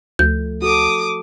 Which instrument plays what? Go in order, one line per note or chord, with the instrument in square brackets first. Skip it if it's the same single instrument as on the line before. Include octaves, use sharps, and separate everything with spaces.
[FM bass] D2 [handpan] F3 A3 [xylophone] G6
[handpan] F#4 A4 [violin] D6 D#6